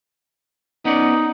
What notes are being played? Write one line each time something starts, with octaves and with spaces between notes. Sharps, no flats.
B3 C#4 D#4 D5